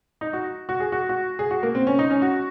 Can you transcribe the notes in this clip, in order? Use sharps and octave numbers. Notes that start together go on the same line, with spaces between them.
D#4
F#4
F#4
G#4
F#4
F#4
G#4
F#4
A#3
C4
C#4
D#4
C#4
F#4